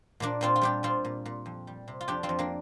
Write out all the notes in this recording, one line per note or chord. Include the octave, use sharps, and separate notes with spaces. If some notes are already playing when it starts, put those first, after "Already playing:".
A#2 A#3 D4
A#2 C4 F4
F4
G3 D4 G4
G3 C4 F4
A#2
A#2
F2
G3
C3
F4
F2 D4 G4
C4 F4
F2
A#3 D4